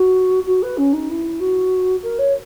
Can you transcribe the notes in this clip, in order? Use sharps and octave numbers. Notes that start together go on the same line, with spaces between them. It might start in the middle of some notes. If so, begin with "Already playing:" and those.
Already playing: F#4
F#4
B4
C#4
D#4
E4
F#4
A#4
C#5